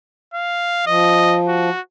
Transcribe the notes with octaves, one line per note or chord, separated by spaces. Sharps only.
F5
F3 D#5
F#4